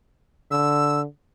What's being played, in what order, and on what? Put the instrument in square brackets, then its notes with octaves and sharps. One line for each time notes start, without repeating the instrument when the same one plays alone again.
[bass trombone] D3 [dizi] E6